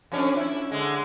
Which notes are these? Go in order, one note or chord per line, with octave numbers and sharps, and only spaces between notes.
F2 C#4 D4
E4
D3 G#3